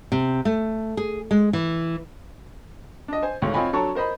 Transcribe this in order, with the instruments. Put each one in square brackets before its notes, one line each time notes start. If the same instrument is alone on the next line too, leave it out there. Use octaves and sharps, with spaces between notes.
[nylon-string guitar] C3
A3
G#4
G#3
E3
[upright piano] D4 D#5
C5 G#5
G#1 D2 G#2 C#5
C4 F4 C#5 D#5 G#5 B5
F#3 D4 A4 C#5 A#5 C#6
A#4 C5 D#5 B5